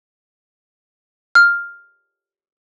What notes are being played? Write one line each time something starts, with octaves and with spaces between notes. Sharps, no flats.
F6